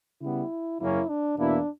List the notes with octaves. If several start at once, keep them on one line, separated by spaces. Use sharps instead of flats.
C#3 G3 B3 E4
F#2 C#3 F#3 A#3 C#4 E4
D4
E2 B2 A#3 D4 E4